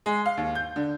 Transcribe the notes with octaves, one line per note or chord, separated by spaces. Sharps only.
G#3
F5
D#2
G6
D3